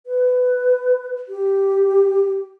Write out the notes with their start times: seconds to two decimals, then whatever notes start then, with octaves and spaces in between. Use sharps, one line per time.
0.06 B4
1.28 G4